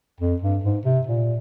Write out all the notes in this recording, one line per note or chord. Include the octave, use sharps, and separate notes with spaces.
F2
G2
G#2
C3
A#2